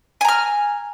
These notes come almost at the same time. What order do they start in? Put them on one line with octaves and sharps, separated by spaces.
G#5 A#5 F6